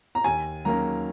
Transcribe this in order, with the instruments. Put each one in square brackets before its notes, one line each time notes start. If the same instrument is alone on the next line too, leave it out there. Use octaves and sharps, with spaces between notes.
[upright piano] A#5
[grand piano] D#2 [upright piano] G#5
[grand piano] D#3 F#3 A#3 C#4 [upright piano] A#5